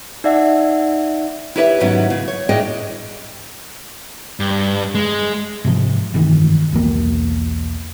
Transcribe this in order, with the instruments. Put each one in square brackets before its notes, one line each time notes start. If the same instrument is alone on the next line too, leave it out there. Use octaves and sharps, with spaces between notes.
[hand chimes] D#4 D5 E5 F#5
[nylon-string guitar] E4 G4 B4 C#5 D5 E5
G#2 D#3 F#3 B3 C#4 E4
C#3
C#5
A2 D4 G#4 D5 D#5 G5
[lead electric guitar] G2
G#3
[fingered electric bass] G#2 C3 F3
F1 G2 D#3 E3
B1 E2 A#3